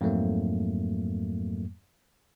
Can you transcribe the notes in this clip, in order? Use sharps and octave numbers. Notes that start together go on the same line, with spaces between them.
F2 G#2 F#3 A3 A#3